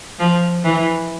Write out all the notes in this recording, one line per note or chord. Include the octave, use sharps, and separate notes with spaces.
F3
E3